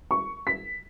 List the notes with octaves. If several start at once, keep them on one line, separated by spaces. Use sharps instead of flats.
C#6
B6